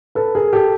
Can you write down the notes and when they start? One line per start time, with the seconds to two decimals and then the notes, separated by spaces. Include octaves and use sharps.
0.15 A4 B4
0.35 G#4 A#4
0.53 G4 A4